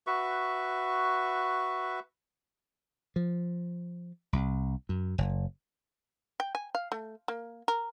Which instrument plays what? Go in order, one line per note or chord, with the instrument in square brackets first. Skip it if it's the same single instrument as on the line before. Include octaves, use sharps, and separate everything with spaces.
[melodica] F#4 B4 E5 C#6
[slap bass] F3
C2
F#2
F#1
[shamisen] G5
G#5
F5
A3
A#3
A#4